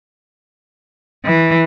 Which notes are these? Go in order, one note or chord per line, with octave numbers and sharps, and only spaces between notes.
E3